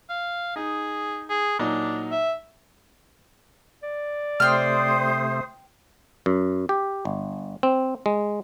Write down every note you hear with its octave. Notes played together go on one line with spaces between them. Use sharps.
F5
D#4 G#4
G#4
A#2 F#3 D4 D#4
E5
D5
C3 A3 C5 G5 D#6 F6
F#2
G4
G1
C4
G#3